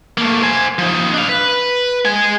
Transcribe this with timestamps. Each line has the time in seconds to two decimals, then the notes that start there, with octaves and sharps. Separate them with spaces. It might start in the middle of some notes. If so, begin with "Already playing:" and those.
0.18 A3 A#3
0.42 C5 G#5
0.78 F3 D#4
1.14 D4 F5
1.29 B4
2.05 G#3 G#5